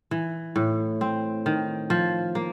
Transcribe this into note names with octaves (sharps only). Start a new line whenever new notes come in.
E3
A2
C4
D#3
F3
A#3